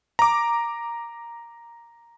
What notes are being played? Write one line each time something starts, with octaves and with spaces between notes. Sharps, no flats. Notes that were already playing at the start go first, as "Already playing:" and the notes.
A#5 D6